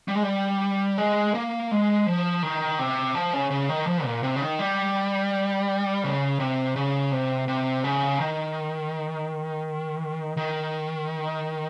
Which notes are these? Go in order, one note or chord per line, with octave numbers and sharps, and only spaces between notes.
G3
G#3
G3
G#3
A#3
G#3
F3
D#3
C3
F3
C#3
C#3
D#3
F3
A#2
C3
C#3
D#3
G3
C#3
C3
C#3
C3
C3
C#3
D#3
D#3